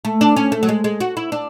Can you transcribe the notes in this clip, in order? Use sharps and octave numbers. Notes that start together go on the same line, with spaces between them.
A3
D4
C#4
A3
F#3
G#3
G#3
F#4
E4
D4